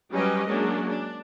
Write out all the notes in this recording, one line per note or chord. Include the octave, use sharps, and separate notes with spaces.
F#3 G3 C#4 G4 B4 D#5
F#3 G#3 A#3 C#4 D4
D4